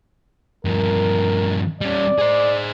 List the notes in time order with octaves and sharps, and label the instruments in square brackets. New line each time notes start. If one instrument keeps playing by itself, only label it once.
[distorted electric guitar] G2 F3 [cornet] A#4
[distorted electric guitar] G3 C#4 [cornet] D5
[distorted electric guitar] G#4 C5